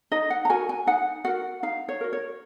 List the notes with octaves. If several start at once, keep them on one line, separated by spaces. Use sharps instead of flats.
D#4 D#5
F#5
A#5
F#4 A#4 G#5
G#5
D#4 F#5
F#4 A#4 F#5
D#4 F5
C#5
F#4 A#4
C#5